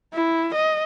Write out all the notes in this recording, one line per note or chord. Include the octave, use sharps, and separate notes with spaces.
E4
D#5